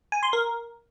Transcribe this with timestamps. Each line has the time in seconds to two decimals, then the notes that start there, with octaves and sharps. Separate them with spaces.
0.12 G#5
0.23 C6
0.33 A#4